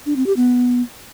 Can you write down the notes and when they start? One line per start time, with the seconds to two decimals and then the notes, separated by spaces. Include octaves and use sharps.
0.06 D4
0.16 C4
0.26 G4
0.37 B3